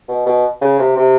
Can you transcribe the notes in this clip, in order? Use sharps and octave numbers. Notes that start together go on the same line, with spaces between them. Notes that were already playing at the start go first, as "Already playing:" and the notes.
B2
B2
C#3
C3
C3